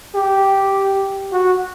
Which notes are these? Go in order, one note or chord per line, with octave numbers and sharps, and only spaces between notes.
G4
F#4